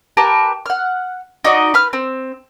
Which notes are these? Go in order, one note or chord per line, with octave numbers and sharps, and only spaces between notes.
G4 A#4 B4 A5
F#5 F6
D#4 F#4 D5 D#5
B4 F6
C4